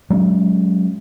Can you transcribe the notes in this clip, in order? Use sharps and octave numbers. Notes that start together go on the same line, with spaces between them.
F#3 G#3 C#4